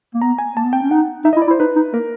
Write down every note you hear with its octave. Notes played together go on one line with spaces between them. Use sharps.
A#3
B3 A#5
G#5
A#3 A5
B3
C4 G5
C#4
D#4 F#5
D#4 E5
E4 D#5
D5
E4
C5
D#4 B4
D#4
A#3 A#4